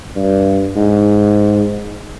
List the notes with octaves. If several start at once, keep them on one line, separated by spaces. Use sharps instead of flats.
G2
G#2